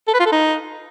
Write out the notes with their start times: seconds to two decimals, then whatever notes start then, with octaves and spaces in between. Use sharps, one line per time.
0.08 A4
0.14 B4
0.20 F4
0.26 A4
0.32 D#4